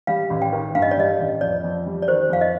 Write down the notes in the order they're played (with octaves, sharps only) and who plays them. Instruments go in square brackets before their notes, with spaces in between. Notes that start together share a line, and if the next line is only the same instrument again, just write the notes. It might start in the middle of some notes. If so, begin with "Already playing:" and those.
[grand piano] G3 [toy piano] F5
[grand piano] A1
[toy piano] G5
[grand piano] D#3
[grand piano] G2 [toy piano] F5
[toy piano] D#5
D5
[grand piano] G3 [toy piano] D#5
[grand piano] A1
[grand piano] F2 [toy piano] D5
[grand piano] F2
G3
[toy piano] D5
[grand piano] D#3 [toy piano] C5
[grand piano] F2 [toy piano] F5
[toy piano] D#5